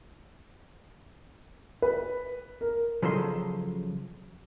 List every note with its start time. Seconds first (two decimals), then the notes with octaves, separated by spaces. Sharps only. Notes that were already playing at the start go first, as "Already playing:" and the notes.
1.82 B4
2.61 A#4
3.02 C#3 F3 F#3 A4 D#5 C6